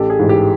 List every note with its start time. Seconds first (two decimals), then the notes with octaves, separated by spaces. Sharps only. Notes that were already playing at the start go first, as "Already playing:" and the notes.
Already playing: A1 G4 A4
0.10 G#4
0.19 G#2 E3
0.29 G4